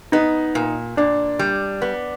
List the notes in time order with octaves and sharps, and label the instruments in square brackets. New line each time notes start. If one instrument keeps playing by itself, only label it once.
[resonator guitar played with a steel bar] B3 [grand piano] D#4
[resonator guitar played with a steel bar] A#2
[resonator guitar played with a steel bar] A#2 [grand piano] D4
[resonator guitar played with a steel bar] G3
B3